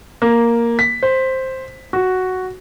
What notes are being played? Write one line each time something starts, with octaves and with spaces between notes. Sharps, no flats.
A#3
B6
C5
F#4